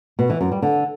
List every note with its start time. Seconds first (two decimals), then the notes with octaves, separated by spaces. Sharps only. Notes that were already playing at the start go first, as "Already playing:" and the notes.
0.19 B2
0.30 E3
0.41 F#2
0.52 G3
0.62 D3